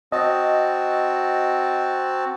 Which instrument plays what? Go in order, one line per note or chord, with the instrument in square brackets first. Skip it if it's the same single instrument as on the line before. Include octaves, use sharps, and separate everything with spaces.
[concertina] C4 F#4 A5 [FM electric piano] D#5